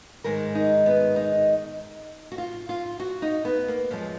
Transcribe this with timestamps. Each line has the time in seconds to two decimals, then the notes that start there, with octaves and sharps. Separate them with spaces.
0.24 G#2 D#3 G#3 A#4
0.55 D#4
0.86 B3
1.16 D#4
2.32 F#4
2.38 F4
2.69 F4
3.00 F#4
3.22 D#4
3.45 B3
3.68 A#3
3.91 F#2 F3 G#3 A#3